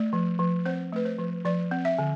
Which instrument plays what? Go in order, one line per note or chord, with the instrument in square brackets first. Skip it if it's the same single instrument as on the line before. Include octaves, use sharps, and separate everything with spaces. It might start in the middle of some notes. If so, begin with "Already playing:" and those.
Already playing: [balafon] A3 D5
F3
F3
C4 C5
A3 B4
C5
F3
F3 D5
C4
E5
D3